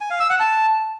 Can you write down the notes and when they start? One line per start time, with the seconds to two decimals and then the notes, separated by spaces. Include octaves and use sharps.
0.01 G#5
0.10 F5
0.20 E6
0.30 F#5
0.40 A5